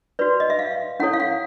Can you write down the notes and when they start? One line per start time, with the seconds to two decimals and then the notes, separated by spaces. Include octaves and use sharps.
0.19 F#4 B4 D5
0.40 D#5
0.50 E5
0.59 F5
1.00 C#4 E4 A4 C#5 F#5
1.13 F5
1.20 F#5